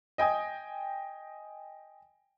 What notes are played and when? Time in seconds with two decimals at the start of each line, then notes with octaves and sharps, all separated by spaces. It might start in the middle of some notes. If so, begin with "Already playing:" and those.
0.18 D#5 G5 G#5 D#6